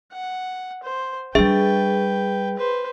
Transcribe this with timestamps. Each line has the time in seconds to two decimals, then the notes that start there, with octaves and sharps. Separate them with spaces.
0.12 F#5
0.83 C5
1.35 G3 D4 G#4 B4 E5 G5
2.57 B4 C5